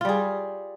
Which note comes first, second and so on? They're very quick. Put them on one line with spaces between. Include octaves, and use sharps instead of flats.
F4 G3 G#4